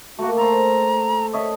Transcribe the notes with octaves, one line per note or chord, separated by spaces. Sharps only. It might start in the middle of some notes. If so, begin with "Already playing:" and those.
A3 A#3 F#4
A4 C5 A#5
A4 C#5 D#5 E5